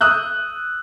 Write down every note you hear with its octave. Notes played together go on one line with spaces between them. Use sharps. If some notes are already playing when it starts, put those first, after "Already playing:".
D#6 E6 F#6 G6